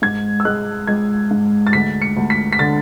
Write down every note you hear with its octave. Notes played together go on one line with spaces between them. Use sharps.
G#2 G#6
E6
G#3 F#6
G#3 G#6
G#2
A6
D2 B6
C#7
D2
B6
B6
D3 A6